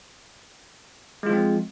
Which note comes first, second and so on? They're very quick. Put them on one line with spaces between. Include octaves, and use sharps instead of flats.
G#3 F4 F3 C4